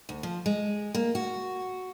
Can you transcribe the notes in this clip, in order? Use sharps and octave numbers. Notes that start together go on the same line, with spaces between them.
D2
F3
G#3
A#3
F#4